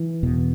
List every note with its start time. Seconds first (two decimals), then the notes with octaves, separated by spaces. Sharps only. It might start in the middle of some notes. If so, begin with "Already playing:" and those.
Already playing: E3
0.23 E2 B2